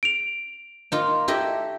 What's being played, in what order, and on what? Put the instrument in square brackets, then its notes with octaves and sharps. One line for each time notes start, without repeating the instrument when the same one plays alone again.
[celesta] D7 F7
[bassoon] A#3 [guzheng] D#4 F4
[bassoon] A3 [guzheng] E4 G4 D#5